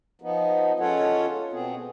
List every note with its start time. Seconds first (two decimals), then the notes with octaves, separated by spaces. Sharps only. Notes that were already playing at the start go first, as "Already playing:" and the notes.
0.21 F3 B3 D#4
0.80 G#3 C#4 F4 A4 C#5 F#5
1.52 B2 B3 C4 G#4